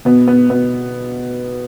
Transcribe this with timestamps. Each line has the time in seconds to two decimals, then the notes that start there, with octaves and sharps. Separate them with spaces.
0.05 B2 B3
0.28 B3
0.50 B2 B3